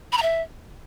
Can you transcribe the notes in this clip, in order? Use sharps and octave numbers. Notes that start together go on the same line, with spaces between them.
B5
A#5
E5